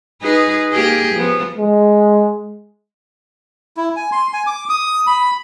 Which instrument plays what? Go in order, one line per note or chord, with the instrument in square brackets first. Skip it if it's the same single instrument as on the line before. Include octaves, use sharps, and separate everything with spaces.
[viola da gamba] D#4 G#4 B4
A#3 G4 G#4
F3 B3 F4
[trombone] G#3
[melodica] E4
G#5
C6
G#5
D6
D#6
B5